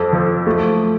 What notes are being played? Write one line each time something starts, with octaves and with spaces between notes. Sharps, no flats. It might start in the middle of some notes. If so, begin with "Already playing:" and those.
Already playing: F2 A4
F3
A3